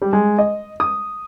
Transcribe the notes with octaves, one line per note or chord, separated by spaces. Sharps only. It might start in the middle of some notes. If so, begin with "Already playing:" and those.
G3
G#3
D#5
D#6